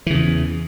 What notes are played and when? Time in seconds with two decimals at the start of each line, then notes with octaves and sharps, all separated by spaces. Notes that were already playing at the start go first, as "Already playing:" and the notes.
0.06 E3
0.10 C#3
0.14 E2